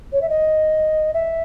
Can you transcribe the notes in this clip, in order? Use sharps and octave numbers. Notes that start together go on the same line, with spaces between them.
C#5
E5
D#5
E5